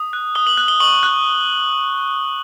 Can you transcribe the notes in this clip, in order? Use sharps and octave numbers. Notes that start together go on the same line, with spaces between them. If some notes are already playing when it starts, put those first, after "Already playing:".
Already playing: D#6
F#6
D#6 G7
F#7
F#6
G7
C#6 F#7
F#6